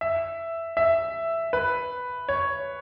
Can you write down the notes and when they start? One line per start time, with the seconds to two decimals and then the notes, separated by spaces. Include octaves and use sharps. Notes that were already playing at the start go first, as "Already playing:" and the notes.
0.01 E5
0.77 E5
1.53 B4
2.29 C#5